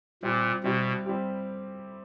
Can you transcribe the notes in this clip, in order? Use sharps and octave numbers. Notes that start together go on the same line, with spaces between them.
A#2 G3 C4 E4 G4
B2 G3 C4 E4 G4
G3 C4 E4 G4